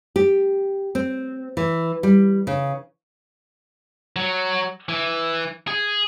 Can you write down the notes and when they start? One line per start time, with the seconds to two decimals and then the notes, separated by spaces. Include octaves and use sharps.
0.16 G4
0.95 C4
1.57 E3
2.03 G3
2.47 C#3
4.16 F#3
4.89 E3
5.67 G#4